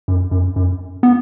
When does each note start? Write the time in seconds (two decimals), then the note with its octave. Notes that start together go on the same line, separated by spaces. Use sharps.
0.08 F#2
0.31 F#2
0.56 F#2
1.03 B3